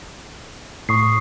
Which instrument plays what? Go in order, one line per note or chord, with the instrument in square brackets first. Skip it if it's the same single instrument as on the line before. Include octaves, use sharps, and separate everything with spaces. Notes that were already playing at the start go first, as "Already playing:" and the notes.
[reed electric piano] A2 [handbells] C#6 D#6 C7